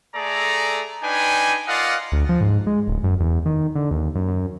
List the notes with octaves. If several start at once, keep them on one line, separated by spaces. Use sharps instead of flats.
A3 G#4 A4 D5 A#5
D4 D#4 B4 G5 G#5
F4 A#4 D5 D#5 F5 F#5
D2
F3
G#2
G#3
D1
F#2
E2
D#3
D3
D#2
F#2
F#2